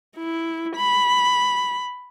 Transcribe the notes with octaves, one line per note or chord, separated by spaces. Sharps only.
E4
B5